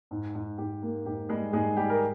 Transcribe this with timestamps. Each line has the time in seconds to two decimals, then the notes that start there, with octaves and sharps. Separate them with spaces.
0.11 G#2
0.34 G#2
0.58 G#2 G4
0.82 A#3
1.06 G#2 G4
1.29 G3 G#3 G#4
1.53 G#2 G#3 G#4
1.76 G3 G4
1.90 A#4